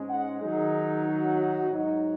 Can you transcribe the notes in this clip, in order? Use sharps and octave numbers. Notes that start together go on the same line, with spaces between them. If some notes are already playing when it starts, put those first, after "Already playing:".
Already playing: G#2 G#3 C#4
F#5
D#3 F#3 D#4 G#4
F#4
G#2 F#3 D#4